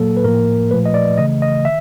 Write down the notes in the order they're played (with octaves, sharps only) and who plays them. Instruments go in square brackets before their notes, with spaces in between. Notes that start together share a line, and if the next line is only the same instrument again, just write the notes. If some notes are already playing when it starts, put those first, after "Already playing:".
Already playing: [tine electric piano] A#2 F#3 A#3 A4
B4
A2 F3 A#3 A#4
A#2 F3 A3 B4
D#5
D5
C#3 E3 A3 D#5
D#5
D#3 E5